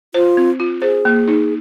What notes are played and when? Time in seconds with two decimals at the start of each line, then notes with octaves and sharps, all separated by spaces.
0.14 F4 C5
0.37 C4
0.60 F4
0.82 G#4 C5
1.05 A#3
1.28 D#4